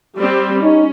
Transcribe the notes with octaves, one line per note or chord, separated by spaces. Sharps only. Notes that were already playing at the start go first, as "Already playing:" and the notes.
G3 C4
C#4 D#4